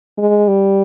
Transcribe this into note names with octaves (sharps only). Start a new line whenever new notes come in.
G#3
G3